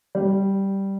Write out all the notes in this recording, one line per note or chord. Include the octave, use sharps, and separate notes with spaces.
G3